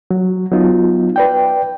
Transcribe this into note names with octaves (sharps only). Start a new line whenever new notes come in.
F#3
F#3 B3 D#4 F4
B4 D5 G5